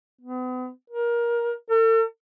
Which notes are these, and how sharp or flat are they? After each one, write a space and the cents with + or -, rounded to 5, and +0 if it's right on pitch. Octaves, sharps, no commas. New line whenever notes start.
B3 +40
A#4 +20
A4 +40